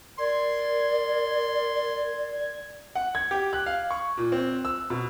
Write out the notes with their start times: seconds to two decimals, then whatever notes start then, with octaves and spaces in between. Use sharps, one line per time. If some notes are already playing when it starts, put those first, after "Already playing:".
0.19 A#4 D5 C6 G#6
2.95 F#5
3.15 G#6
3.31 G4
3.53 F#6
3.66 F5
3.91 C#6
4.17 A#2
4.32 C4
4.65 E6
4.90 B2